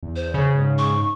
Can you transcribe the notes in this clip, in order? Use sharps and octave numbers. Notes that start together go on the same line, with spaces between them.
E2
C5
C#3
G#2
C#6